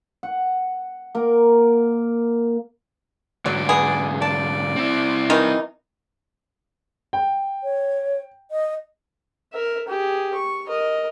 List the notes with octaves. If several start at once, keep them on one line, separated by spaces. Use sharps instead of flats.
F#5
A#3 A#4
G#2 D3 F#3 D5
B3 G#4
D5 A5
C4 E4
D#3 E3 D#4
G5
C#5
D#5
A#4 E5
G4 G#4
C#6
A#4 D#5